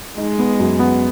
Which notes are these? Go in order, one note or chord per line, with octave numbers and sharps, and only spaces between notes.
G#3 D#4
B3
F#2
B3